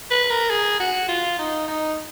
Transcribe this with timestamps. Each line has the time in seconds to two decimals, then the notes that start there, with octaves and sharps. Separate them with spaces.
0.11 B4
0.30 A#4
0.50 G#4
0.80 F#4
1.08 F4
1.39 D#4
1.68 D#4